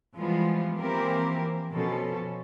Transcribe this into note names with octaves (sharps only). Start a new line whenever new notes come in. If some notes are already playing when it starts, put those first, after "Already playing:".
E3 F3 G3 G#3 B3 F4
E3 F3 A#3 C4 G4 A#4
B2 F3 C#4 A4